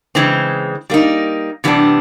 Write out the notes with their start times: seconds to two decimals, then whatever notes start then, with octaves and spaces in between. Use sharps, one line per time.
0.15 C#3 E3 G#3 C4
0.90 G3 A#3 D#4
1.64 C3 E3 G3 B3 D4